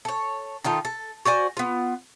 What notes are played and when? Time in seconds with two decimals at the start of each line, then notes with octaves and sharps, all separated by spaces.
0.05 A4 C#5
0.64 D#3 D#4 F4 A4
0.85 A4
1.25 F#4 C5 D5 G#5
1.57 B3 F4